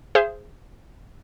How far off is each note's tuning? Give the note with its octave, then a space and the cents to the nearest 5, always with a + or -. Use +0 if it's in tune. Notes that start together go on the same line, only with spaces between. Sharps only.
G#4 +0 C5 +0 E5 +45